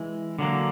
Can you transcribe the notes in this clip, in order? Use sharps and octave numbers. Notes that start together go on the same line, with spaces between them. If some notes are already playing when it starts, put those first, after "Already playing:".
Already playing: E3 G#3
D3 F#3 A#3